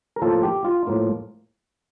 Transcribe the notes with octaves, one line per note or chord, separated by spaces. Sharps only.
A#4
A2 F3 A#3 F4 A4
G4
F4
A2 F3 A#3 F4